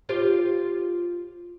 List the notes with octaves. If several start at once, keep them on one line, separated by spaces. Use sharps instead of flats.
F4 G4 C5